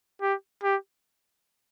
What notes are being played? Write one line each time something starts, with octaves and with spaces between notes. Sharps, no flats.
G4
G4